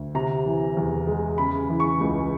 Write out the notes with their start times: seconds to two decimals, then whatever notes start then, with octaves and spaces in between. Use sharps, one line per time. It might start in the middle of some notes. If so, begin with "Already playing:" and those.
Already playing: D2
0.15 C3 A#5
0.46 E3
0.77 E2
1.07 G#3
1.38 C#3 B5
1.70 E3
1.80 C#6
2.01 C#2